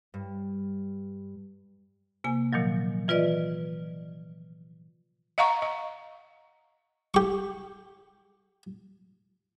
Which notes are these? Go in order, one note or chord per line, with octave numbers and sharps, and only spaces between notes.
G2
C3 A#3 G#5
A#2 D#3 F3 F#3
E3 F4 B4 D5 D#5
D#5 F5 F#5 A#5 C#6
D#5
G4 C#6